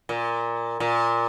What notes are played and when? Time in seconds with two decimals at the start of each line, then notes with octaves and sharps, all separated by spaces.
0.09 A#2
0.80 A#2